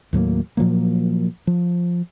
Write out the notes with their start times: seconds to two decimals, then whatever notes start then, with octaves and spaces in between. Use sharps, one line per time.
0.13 D#2 A2 F#3 A#3
0.57 A#2 F3 F#3 A#3
1.47 F3